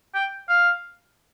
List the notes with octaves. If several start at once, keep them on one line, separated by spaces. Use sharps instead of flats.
G5
F5